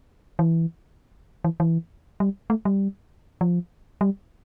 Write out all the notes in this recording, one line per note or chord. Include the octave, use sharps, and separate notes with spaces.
E3
E3
E3
G3
A3
G3
F3
G3